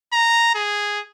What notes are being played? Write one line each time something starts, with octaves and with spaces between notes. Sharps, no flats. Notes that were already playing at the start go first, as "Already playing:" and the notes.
A#5
G#4